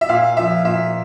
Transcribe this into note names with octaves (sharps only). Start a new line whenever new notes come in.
E5
A#2 F5
F3 E5
A#2 E5